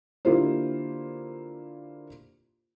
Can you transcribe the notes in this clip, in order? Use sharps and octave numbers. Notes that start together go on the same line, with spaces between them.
D3 A#3 E4 F4 G4 C5